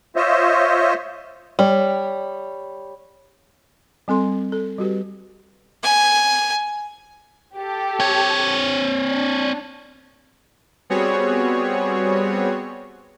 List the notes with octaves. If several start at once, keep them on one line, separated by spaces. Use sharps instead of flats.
F4 C5 C#5 D#5 E5
G3 C#5
G3 C4 A4 C6
A4
G3 F#4 G4 B4
G#5
G4 A4
C4 C#5
D4
G3 B3 C4 F#4 G#4 C#5